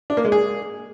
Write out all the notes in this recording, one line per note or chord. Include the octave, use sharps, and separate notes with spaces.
D4
A#3
G#3
G#4